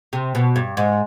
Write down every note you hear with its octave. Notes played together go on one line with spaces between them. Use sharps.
C3
B2
G2
G#2